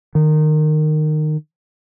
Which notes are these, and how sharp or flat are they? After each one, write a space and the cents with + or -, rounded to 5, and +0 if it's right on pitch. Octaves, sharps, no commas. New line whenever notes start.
D#3 -20